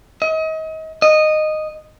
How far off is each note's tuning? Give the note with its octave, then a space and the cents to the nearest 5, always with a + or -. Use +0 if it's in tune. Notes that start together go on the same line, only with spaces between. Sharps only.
D#5 +35
D#5 -10